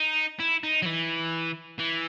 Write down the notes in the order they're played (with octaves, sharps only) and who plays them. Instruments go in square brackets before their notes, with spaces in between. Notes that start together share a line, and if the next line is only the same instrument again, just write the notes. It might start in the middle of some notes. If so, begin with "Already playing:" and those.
Already playing: [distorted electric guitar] D#4
E4
D#4
F#3
E3
E3